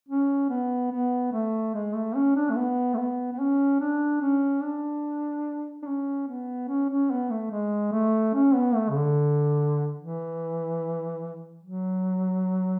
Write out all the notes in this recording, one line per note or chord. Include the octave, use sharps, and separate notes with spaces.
C#4
B3
B3
A3
G#3
A3
C#4
D4
A3
B3
A3
B3
B3
C#4
D4
C#4
D4
D4
C#4
B3
C#4
C#4
B3
A3
G#3
A3
C#4
B3
A3
C#3
D3
E3
F#3